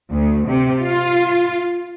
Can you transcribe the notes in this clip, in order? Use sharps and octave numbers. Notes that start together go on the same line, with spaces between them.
D2
C3
F4